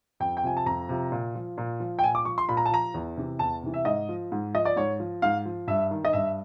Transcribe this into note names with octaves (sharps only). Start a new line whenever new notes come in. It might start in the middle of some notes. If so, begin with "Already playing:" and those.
F2 G5
G5
C3 F3 G#5
A5
F2 A#5
C3 F3
A#2
F3
A#2
F3
G5
A#2 G#5
D6
F3 C#6
C6
A#2 B5
A#5
A5
F3 A#5
E2
C3 E3
E2 A5
C3 E3
E5
G#2 D#5
F3
G#2
F3 D#5
D5
G#2 C#5
F3
G#2 F5
F3
G2 E5
D#3
D#5
G2 E5